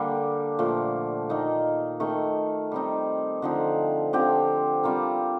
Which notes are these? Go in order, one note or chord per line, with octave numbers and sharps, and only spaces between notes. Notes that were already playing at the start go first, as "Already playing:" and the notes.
Already playing: D3 G3 A#3 D4 G4
A#2 F3 A3
D#3 A#3 D#4
D#3 A3 D#4
G3 C4 D#4
D3 F3 C4 D#4
D3 F3 C4 G4
G3 C4 F4 A#4